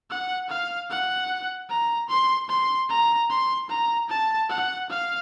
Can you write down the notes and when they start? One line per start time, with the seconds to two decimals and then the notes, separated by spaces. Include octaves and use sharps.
0.10 F#5
0.49 F5
0.90 F#5
1.70 A#5
2.09 C6
2.49 C6
2.90 A#5
3.30 C6
3.70 A#5
4.09 A5
4.50 F#5
4.89 F5